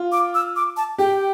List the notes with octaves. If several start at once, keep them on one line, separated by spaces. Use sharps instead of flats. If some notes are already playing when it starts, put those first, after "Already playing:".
Already playing: F4
D6
E6
D6
A5
G4 G5